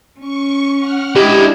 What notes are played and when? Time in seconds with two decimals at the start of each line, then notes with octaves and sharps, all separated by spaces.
0.20 C#4 C#6
0.79 F#5 F6
1.16 G#3 D4 E4 G4 D#5